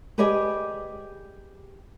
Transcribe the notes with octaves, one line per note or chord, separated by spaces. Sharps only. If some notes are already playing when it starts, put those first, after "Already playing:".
G4 G#4 B4 D5 D#5 G#5